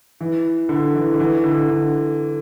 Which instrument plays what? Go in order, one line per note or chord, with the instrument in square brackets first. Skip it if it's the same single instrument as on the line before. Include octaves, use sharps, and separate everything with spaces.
[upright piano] E3
D3
E3
D3
E3
D3
D3